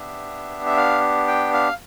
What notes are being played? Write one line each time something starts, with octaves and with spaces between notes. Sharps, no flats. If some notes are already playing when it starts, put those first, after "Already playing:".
Already playing: B3 D4 G4 E5
E5
F5
G5
F5